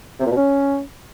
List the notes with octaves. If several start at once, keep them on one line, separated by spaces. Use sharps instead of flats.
C3
A#2
B2
C#4